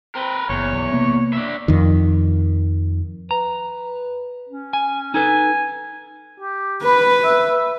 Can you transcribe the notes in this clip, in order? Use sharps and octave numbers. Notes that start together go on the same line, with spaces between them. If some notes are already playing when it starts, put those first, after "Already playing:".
C4 A#4 B4
F#1 E2 C#5
B1
C3 A#3 B3
D4 E5
F2 D#3
B4 A#5
C#4
G#5
D#4 A4 B4 G#5
G4
B4 B5
E5